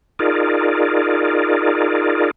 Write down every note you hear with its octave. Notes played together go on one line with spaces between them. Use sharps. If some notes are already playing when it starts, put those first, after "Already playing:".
D#4 F4 G#4 A#4 D5